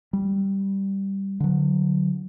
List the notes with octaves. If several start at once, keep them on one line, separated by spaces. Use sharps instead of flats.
G3
D3 F#3